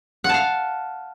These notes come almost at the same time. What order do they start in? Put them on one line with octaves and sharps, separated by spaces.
F#5 A5 F5